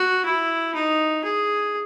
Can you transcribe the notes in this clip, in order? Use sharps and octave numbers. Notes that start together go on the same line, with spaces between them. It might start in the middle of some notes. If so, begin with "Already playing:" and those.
Already playing: F#4
E4
D#4
G#4